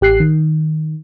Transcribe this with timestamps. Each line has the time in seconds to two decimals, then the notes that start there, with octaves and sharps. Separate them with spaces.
0.01 A1 G4 F#6 C7
0.20 D#3